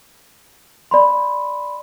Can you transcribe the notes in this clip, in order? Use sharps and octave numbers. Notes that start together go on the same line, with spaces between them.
D5 B5 C6